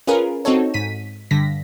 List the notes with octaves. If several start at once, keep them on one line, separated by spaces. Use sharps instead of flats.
C#4 F4 G#4 A#4 B4
C4 D#4 F#4 A4 C#5
G#2 B6 D#7
G2 D3 A#6 B6